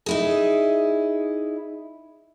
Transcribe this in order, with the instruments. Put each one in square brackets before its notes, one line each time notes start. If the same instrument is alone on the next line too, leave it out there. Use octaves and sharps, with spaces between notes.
[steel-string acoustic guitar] D#4 E4 G#4